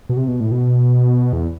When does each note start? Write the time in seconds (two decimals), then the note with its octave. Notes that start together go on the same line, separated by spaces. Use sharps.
0.09 B2
0.17 C3
0.28 B2
0.40 A2
0.52 B2
1.33 E2